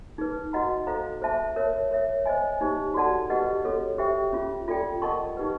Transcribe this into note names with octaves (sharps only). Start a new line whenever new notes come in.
D#4 G#4 B4
F#4 B4 D#5 F#5 A#5
A4 C5 F5 A#5
G#4 C5 E5 A5
A#4 C#5 E5
A#4 C#5 E5
C5 D#5 G#5
D#4 G4 C5
F#4 A4 D5 F#5 A5
G4 B4 D#5 F#5
C#4 F#4 A4 C#5
G4 C5 E5 G5
C#4 F4 G#4
F4 A4 D5 G5
A#4 D#5 F#5 A5 C#6
D#4 G4 B4